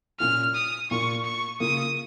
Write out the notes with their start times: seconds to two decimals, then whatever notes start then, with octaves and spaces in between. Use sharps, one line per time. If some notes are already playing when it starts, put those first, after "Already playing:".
0.20 A#2 A#3 C#4 F4 F6
0.55 D#6
0.91 A#2 A#3 F4 C#6
1.25 C#6
1.60 C#3 A#3 F4 D#6